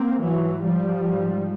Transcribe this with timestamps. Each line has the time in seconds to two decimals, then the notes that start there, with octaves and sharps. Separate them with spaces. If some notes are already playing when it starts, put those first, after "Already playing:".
Already playing: A#3 C4
0.22 G#2 E3 F#3
0.64 F3 G3
1.07 G#2